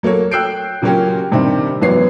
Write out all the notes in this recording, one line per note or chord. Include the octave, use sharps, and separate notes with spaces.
F#3 A#3 A4 C#5
G5 E6 F#6 G6 C7 D7
A#2 C#3 F#3 A#3 C#4 G4
G2 C3 D#3 C4 D4
G#1 F#2 E3 B3 C#5 C7